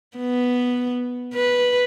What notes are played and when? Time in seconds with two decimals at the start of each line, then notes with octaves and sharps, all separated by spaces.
0.18 B3
1.34 B4